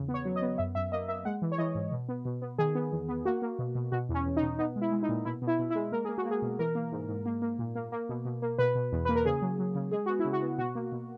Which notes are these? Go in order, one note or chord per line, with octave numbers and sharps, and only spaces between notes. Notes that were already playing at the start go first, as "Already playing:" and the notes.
Already playing: E2 C#3
B3
C#5
F#3
D#5
B3
F#2 E5
F#2 E5
A#3 D#5
A#3 E5
G#3 F#5
E3
C#5
E3 D#5
G#2
B2
B3
B2
B3
D#3 G#4
B3
E2
B3
A#3 F#4
A#3
B2
B2
B2 F#4
E2
C#4
E2
D#4
B2
B3 D#4
G#3
E4
G#3
D#4
A#2
B2 E4
B2
E4
B2
E4
G#3
A#3 A#4
A#3 G#4
F#4
A#3
G#4
B2
E3 A#4
A#3
G#2
G#2
A#3
A#3
A#2
A#3
A#3
B2
B2
A#3
B2 B4
B2
E2
A#3 B4
A#4
C#3 G#4
F#3
F#3
C#3
G#3 G#4
B3 F#4
E4
C#3
F#4
B3
B2 F#4
A#3
B2